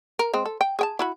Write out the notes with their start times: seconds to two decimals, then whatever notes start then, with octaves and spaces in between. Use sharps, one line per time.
0.19 A#4
0.34 G#3 C4
0.45 A4
0.61 G5
0.79 G#4 G5 A5
0.99 E4 F#4 B5